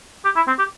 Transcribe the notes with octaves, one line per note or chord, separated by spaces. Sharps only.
G4
E4
C4
G4